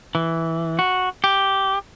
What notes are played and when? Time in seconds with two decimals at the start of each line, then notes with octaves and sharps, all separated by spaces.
0.15 E3
0.79 F#4
1.24 G4